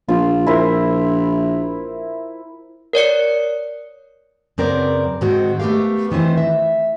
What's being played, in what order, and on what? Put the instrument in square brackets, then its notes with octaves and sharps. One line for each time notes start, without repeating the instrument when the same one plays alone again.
[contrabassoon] A#1 [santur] F4
[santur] E4 A#4 C5
[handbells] A#4 C#5 D5 C#7
[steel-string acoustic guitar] F#2 C#3 B3 C4 A#4 D5
G#2 D#3 C4 F#4
A3 B3 G4 A#4 F5
F#2 D#3 E3 C4 F4
E5